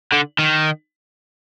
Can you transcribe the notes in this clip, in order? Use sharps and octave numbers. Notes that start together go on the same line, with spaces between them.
D3
D#3